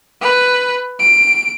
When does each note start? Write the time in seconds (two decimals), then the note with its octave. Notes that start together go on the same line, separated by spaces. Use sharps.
0.21 B4
1.00 D7